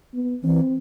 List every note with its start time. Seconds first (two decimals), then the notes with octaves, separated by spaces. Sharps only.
0.14 B3
0.43 E3 C4